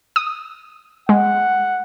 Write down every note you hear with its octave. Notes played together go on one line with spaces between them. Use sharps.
D#6
G#3 F#5